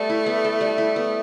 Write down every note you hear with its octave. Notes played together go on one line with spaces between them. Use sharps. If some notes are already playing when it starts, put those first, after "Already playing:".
Already playing: G3 A3 B3 A4
E4
B3
A4
G3
E4
B3